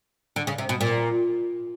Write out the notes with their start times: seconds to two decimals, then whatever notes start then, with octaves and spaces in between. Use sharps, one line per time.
0.36 D3
0.47 C#3
0.58 C3
0.69 B2
0.81 A#2